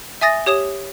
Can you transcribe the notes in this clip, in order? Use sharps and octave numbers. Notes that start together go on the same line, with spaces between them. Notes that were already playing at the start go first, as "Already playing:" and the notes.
E5 G#5 D#6 A6 A#6
G4 C#5 D#6 E7